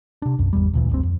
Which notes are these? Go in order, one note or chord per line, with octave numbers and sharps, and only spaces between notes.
C3 D4
B1 F#2
G#1 E2 G3
D2 A#2 E3
F#1 D2 G2 C4
F2